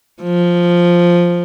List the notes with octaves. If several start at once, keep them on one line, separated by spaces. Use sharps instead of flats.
F3